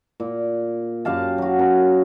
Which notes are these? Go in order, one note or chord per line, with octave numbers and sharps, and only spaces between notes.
A#2
F#2 G4 F5 A5
F#3 F#4
C#4 A#4